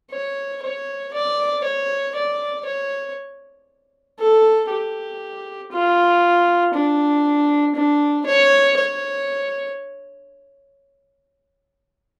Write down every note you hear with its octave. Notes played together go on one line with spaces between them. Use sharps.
C#5
C#5
D5
C#5
D5
C#5
A4
G4
F4
D4
D4
C#5
C#5